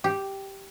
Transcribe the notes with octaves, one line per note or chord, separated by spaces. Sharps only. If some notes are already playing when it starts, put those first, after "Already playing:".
G4